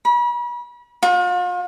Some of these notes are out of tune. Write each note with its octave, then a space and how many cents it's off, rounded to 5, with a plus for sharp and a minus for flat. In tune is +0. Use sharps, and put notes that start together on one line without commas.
B5 -40
F4 +40